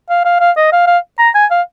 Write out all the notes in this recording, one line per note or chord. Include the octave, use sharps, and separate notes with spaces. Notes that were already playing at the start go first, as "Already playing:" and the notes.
F5
F5
F5
D#5
F5
F5
A#5
G#5
F5